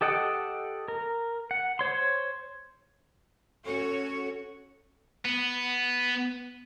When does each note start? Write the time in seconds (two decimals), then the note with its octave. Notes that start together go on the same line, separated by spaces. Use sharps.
0.01 G4 A4 D#5 F#5 G5
0.88 A#4
1.51 F#5
1.79 C5 C#5 C6
3.66 C#4 F#4 A4 C#5
5.25 B3